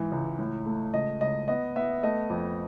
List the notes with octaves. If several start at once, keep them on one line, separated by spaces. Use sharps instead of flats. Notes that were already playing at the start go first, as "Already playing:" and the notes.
Already playing: G#2 E3
C#2
A2
A3
C#2 D#5
C#2 D#5
B3 D#5
B3 E5
A3 D#5
F2